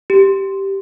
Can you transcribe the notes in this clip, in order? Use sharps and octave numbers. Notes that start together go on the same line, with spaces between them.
G4